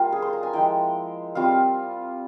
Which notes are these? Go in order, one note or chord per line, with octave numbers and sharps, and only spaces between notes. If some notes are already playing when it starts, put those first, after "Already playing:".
Already playing: G3 A#3 F4
G#4
C5
A#5
G#5
F3 G#3 E4 G5
G3 C4 F4 F5